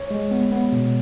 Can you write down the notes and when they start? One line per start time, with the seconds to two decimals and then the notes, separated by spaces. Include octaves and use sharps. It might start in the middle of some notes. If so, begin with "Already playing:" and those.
Already playing: C#5
0.11 G#3
0.31 B3
0.51 B3
0.72 B2